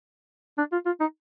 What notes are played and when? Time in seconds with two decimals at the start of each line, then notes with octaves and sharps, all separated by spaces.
0.58 D4
0.72 F4
0.86 F4
1.00 D#4